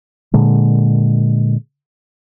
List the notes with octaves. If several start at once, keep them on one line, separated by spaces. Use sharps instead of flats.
A#2 D3 G#3